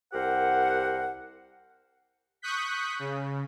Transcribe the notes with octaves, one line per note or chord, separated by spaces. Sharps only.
C2 G4 A#4 C5 F#5
C#6 D#6 F#6 G6 B6
C#3